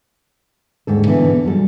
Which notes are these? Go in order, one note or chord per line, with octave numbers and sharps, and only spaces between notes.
D#2 G#2 D3 A4
B2 D3 E3 B3
F#2 G3 F#4 A4